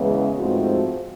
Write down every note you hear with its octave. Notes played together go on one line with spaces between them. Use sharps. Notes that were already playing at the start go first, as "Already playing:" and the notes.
Already playing: E2 C#3 E3 G#3 B3
G#2 F3 A3 C4 F#4